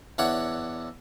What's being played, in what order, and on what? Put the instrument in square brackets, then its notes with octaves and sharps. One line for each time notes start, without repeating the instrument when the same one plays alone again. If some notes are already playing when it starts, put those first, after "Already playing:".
[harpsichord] E2 D4 E4 C#5 F#5